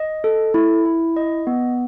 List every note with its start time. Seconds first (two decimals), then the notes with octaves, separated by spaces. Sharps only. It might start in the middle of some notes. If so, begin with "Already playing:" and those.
Already playing: D#5
0.24 A4
0.54 E4
0.86 E4
1.17 D#5
1.47 B3